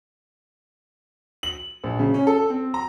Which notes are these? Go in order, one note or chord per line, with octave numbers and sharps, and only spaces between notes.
F#7
A#1
C#3
C#4
A4
C4
A#5